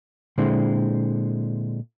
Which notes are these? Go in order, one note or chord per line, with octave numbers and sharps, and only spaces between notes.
A#2 D3 G#3 C4 E4